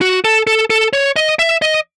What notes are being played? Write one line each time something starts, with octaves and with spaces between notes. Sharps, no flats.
F#4
A4
A4
A4
C#5
D#5
E5
D#5